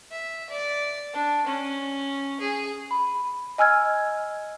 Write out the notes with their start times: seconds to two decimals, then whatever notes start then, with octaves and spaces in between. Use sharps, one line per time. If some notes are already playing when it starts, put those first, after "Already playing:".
0.11 E5
0.50 D5
1.13 D4
1.46 C#4
2.40 G#4
2.91 B5
3.58 D#5 G#5 E6 F6 G#6